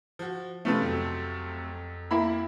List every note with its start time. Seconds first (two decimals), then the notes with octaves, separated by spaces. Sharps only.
0.19 F3 F#4
0.65 C3 F3 A3 C#4 F4 B4
0.82 F2 F#3
2.11 A#3 E4 B5